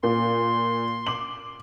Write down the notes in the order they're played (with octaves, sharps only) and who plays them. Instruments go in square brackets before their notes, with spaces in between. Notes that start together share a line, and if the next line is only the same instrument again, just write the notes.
[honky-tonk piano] A#2 [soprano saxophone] C6
[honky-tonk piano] D6 F#7